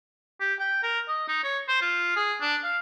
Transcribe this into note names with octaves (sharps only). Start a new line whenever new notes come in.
G4
G5
A#4
D#5
D#4
C#5
C5
F4
G#4
D4
F5